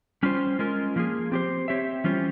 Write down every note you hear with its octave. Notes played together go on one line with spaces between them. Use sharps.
G3 C#4 F4 C5
G#3 C#4 F4 A#4
F3 A#3 F4 G#4
C4 G4 C5
C4 G4 C#5 E5
E3 G3 C#4 F4 C5